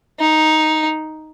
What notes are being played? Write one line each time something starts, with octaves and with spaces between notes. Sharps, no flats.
D#4